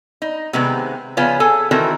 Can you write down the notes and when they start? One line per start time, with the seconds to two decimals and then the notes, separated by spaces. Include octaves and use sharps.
0.22 D#4
0.53 C3 D#3 G#3 B3 C4
1.17 C#3 F3 B3 C#4 F4
1.40 G#4 A4 G#5
1.71 D#3 E3 C4 F#4 A4 A#4